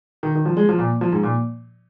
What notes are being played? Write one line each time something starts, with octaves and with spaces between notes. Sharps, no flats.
D#3
D#3
F3
G#3
F3
A#2
F3
G#2
A#2